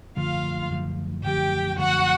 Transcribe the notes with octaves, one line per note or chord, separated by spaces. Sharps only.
F#2 D3 F3 A3 F4 F5
F#2 D3 F3 A3
F#2 D3 F3 A3 G4 G5
F#2 D3 F3 A3 F#4 F#5